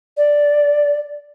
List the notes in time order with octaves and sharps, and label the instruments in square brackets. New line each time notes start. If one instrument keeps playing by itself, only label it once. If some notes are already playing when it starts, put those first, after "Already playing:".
[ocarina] D5